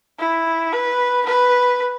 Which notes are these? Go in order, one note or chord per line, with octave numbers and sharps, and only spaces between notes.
E4
B4
B4